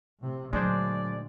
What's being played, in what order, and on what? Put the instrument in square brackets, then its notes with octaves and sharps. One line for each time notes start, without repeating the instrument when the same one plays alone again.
[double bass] A2 C3
[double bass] D2 A#2 [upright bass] F#3 [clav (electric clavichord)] G#3 D4 C5 [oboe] D5